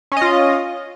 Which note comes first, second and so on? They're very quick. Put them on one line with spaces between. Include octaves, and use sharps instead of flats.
C#4 D#5 F4